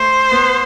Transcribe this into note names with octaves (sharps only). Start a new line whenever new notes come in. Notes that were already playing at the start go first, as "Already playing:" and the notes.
Already playing: A3 C5
B3